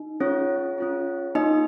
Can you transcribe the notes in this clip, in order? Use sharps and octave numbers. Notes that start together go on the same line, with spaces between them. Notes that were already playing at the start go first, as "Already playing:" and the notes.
Already playing: D#4
C#4 F4 G#4 C#5
C#4 F4 G#4
A#3 D#4 F4 G#4 D#5